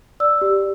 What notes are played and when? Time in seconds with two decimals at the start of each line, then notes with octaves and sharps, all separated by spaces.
0.20 D5 E6
0.41 G4